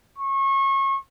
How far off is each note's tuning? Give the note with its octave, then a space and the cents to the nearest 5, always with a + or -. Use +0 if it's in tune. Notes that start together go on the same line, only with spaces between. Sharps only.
C#6 -30